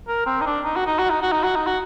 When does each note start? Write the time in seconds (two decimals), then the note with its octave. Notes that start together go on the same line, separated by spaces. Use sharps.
0.08 A#4
0.26 C4
0.41 D#4
0.46 D4
0.65 D#4
0.76 F#4
0.87 D#4
0.99 F#4
1.11 D#4
1.22 F#4
1.32 D#4
1.44 F#4
1.56 D#4
1.67 F#4